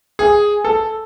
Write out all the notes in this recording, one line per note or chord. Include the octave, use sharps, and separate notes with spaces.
G#4
A4